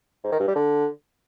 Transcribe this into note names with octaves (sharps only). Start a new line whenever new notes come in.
G#2
D#3
G2
G3
D3